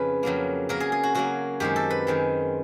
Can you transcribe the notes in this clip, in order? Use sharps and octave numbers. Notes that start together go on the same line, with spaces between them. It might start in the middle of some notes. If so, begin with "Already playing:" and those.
Already playing: F2 C#3 D#4 B4
F2 C#3 F#3 A#3
C#3 F#3 A#3 A#4
G#4
G#4
F#4
C#3 F#3 A#3 F#4
F#2 D#3 G#3 C4 G4
A4
B4
F#2 D#3 G#3 C4